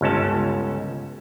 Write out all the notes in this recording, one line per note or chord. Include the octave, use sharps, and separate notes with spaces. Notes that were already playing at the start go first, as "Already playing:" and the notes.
G1 C#2 C#4 A5